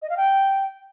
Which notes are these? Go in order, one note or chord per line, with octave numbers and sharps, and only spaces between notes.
D#5
F5
G5